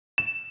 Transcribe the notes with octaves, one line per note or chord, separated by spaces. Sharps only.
E7